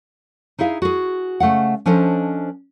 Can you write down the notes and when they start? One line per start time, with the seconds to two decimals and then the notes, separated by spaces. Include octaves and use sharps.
0.59 D#4 E4 G#4 E5 F5
0.82 F#4 G#4
1.40 C#3 A3 F5 F#5
1.86 F3 C#4 D4 A4 C5 D#5